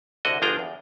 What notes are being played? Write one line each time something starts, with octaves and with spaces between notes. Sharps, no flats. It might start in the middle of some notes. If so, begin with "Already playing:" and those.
C2 D3 F#4 D#5
G1 F3 D4 G#4 G5 A#5
E2